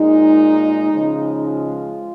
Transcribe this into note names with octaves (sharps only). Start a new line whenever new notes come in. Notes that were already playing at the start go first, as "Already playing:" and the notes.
Already playing: A#2 G#3 D#4
C#3 F3 G#3
F4